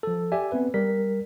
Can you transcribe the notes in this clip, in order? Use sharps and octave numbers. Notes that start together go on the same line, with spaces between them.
F3 A4
G4 D5 E5 G#5
B3 C4 B4
G3 A#4 B6